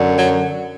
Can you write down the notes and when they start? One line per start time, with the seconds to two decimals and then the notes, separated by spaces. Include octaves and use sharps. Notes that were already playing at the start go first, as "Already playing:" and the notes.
Already playing: F#2 D3
0.18 F#3